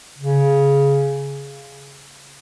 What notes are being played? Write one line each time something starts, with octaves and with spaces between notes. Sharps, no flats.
C#3